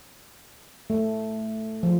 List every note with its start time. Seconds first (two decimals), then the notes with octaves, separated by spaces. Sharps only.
0.90 A3
1.83 F3